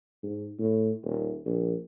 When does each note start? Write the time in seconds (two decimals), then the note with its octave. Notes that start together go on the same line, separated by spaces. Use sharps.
0.23 G#2
0.59 A2
1.04 D#1
1.45 A#1